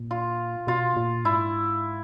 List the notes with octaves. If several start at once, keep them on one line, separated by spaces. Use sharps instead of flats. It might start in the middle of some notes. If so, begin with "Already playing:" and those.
Already playing: A#2
F4
B2 F4
A#2
G#2 E4